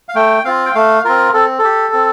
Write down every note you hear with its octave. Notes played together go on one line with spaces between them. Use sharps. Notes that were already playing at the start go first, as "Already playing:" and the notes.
F5
A3 G5
C4 F4 F5
G5
A3 F5
C4 F4 A#4
C4 A4
A4
G4
C4